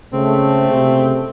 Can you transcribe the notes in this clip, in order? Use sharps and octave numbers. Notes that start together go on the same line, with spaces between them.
A#2 C#3 G#3 A3 C4
C3